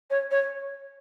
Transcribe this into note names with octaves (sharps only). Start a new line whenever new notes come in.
C#5
C#5